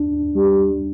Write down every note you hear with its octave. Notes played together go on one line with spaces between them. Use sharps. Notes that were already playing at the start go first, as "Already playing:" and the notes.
Already playing: D4
G3